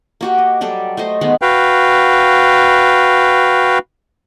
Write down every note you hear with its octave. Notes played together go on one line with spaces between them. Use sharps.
A#3 F#4 G4
D#5
F#3 G3 G4 A4
A3 C5 D#5
D#3 G#3 B3
F#4 B4 F5 G5